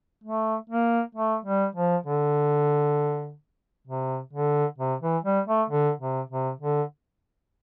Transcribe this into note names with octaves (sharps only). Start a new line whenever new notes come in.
A3
A#3
A3
G3
F3
D3
C3
D3
C3
E3
G3
A3
D3
C3
C3
D3